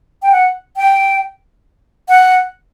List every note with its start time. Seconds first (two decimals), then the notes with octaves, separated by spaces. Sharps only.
0.23 G5
0.32 F#5
0.77 G5
2.09 F#5